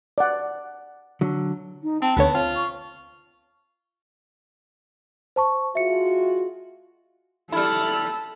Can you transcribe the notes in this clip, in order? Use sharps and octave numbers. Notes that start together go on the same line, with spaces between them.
D5 F#5
D3 F#3
D#4
C4 A5
D2 D3 B3 C#5
C4 F4
C#6
C5 A5 C#6
G#3 F4 F#4 E5 C#7
G3 E4 A4 B5 F6